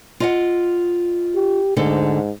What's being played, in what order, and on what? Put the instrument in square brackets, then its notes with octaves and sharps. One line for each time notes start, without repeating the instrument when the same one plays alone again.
[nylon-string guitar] F4 D#5 F#5
[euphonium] G4
[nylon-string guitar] D2 D3 A4 [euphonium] G#2